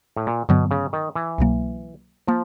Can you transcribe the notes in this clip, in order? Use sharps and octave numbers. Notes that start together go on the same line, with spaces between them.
A2
A#2
G2 B2 D3 F#3 B3
C#3
D#3
E3
C2 B2 F#3 A#3
F3 A#3